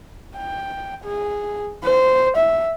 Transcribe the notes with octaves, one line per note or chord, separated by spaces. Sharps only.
G5
G#4
C5
E5